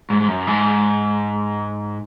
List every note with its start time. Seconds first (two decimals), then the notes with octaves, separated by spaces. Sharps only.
0.10 G#2
0.21 G#2
0.28 F#2
0.47 G#2